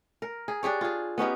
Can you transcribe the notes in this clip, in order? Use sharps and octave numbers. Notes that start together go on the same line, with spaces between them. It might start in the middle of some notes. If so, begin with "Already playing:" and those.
A#4
G#4
D4 G4 G#4 C#5
F4 G#4
B3 C#4 D#4 G4